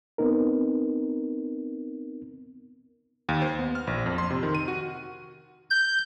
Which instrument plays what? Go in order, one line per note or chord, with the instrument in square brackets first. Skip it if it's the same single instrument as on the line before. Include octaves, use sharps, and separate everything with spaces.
[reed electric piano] B3 C4 D#4 A#4
[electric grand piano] D#2
C5
B3
F6
A#1
F2
C6
C3
D#3
D#7
F#4
[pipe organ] G6